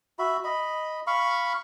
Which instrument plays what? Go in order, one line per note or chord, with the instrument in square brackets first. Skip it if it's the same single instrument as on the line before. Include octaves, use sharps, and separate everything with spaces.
[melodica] F#4 E5 B5
D#5 B5
F5 B5 C#6